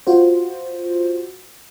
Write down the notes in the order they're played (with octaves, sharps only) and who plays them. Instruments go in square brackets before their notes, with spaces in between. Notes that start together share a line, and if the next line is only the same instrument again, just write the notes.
[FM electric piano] F4 F#4 C5